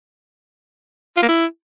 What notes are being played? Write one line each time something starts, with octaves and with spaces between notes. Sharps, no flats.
F4
A#3
E4